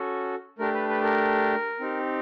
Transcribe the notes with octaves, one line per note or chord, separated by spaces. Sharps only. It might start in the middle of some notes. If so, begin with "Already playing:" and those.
Already playing: C#4 F#4 A4
A3 D4 G4 A#4
B4
B4
A#4
C4 D#4 G4